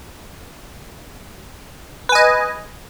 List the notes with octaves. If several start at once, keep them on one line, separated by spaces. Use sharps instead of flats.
B4 D#5 G#5